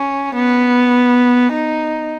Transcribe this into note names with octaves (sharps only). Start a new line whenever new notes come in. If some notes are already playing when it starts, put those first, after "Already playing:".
Already playing: C#4
B3
D#4